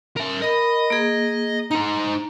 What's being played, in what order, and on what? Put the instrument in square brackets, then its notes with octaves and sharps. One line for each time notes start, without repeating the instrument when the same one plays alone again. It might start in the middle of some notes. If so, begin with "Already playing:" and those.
[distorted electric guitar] A#4 E5
[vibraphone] A#4 B5 [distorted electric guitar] D#5
[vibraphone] A#3 G#4
[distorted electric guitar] D#4 C5 [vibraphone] A#5